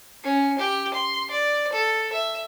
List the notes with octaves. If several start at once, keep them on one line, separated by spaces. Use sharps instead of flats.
C#4
G4
C6
D5
A4
E5